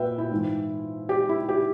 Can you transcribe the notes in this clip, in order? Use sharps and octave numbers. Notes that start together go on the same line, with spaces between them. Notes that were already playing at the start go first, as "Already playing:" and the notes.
Already playing: A#2 B4 E5 G5
E4
G#2 E3
G4
E4
G4